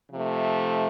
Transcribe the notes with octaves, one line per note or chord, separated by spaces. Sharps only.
C3 F3 A3